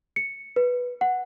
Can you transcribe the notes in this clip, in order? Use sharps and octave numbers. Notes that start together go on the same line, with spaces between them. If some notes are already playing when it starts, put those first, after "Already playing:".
C#7
B4
F#5